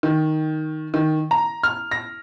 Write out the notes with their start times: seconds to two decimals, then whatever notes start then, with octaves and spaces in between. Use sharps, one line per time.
0.03 D#3
0.94 D#3
1.31 A#5
1.63 F6
1.91 A#6